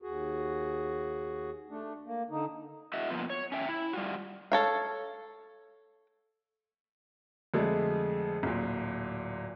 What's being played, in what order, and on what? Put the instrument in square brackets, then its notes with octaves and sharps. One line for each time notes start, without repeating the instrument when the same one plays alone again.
[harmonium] D#2 F#4 G#4
A3 D4
A#3
D3 D#4
[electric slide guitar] E4 F#4 D#5 E5
F3 A#3 B3 F4 B4 C5
C#5
C#4 E5 G5
E4
G3 F4 F#4
[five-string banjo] A4 C#5 F5
[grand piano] F2 D3 G#3 A3
D1 A#2